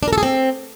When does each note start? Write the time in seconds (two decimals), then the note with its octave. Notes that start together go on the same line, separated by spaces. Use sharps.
0.03 D4
0.08 A#4
0.13 A4
0.18 G#4
0.23 C4